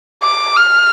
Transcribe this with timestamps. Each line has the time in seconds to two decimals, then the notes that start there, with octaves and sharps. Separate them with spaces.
0.23 D6
0.56 F6